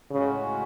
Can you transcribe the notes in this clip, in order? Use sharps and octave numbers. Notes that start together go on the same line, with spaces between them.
A2 C#3 G#3 C#4 F#4